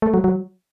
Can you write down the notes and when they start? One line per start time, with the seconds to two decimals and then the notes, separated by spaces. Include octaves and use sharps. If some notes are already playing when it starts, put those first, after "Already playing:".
0.02 A3
0.14 F#3
0.24 F#3